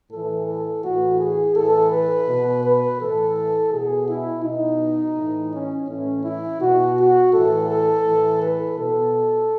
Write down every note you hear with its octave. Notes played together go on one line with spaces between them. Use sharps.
A2 E3 A4
A4
A2 E3 F#4
G#4
A2 E3 A4
B4
B2
B4
A2 E3 A4
B2 G#4
E4
B2 D#4
A2 E3
C#4
A2 E3 C#4
E4
B2 F#4
F#4
A2 E3 A4
A4
A2 E3
B4
B2 A4